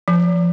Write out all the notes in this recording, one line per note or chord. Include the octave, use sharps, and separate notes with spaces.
F3